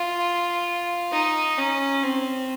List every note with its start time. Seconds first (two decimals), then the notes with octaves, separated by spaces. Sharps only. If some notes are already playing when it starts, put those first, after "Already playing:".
Already playing: F4
1.12 D#4
1.58 C#4
2.03 C4